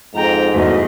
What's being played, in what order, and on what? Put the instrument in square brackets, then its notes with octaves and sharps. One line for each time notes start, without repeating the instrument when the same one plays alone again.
[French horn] F2 [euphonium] G#2 [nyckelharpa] G5 A#5
[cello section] E2 G2 D#5 [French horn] B2 [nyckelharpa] A3